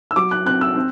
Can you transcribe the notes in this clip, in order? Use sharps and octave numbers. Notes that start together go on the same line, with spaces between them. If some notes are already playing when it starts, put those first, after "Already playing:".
E6
F#3 D6
F#6
C4 F#6
E6
C4